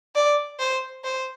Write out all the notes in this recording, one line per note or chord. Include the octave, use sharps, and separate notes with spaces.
D5
C5
C5